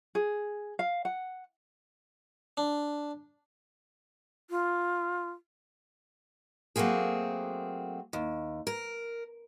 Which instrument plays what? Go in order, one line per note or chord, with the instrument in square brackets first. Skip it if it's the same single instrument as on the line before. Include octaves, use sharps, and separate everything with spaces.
[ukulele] G#4
F5
F#5
[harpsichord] D4
[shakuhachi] F4
[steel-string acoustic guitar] F#3 A3 A#3 C4 G#4
D#2
A#4